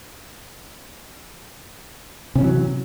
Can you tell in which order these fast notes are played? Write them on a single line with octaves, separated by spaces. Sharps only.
C3 C#4 E3 F#3